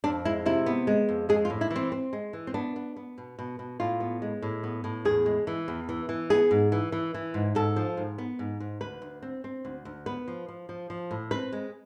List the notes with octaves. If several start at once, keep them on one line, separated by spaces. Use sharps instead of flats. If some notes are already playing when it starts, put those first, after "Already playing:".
F2 D4
G#3 E4
C3 E4
B3
G#3
F2
G#3 G#4
F4
A2
E4
E3
C4
C4
G#3
E3
C4
B3 D4
B3
B3
B2
B2
B2
A2 F4
B3
G#3
A2
B3
A2
E2 G#4
G#3
E3
E2
E3
E3
B3 G#4
G#2
E3
E3
E3
G#2
G#2 A4
F3
G#2
B3
G#2
G#2
D2 B4
D2
C4
C4
D2
D2
B3 B4
F3
F3
F3
F3
A2
C4 B4
G#3